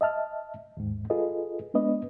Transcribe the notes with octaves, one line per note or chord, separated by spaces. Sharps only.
D#5 E5 A5 F6
D#2 G#2
F4 G#4 A4 B4 D#5
G#3 B3 D4 B4 D#5